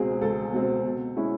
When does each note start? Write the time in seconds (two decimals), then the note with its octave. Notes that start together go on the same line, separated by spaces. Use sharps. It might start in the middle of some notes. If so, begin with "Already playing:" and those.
Already playing: C#2 B2 G#3 C4 G#4
0.21 C#2 A4
0.53 B2 G#3 C4
0.85 B2
1.16 G#3 C#4 E4